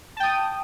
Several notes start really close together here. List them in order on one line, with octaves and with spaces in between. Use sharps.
A5 G5 D#6